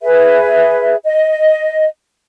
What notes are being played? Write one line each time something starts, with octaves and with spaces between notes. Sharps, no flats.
G#4 B4 E5
D#5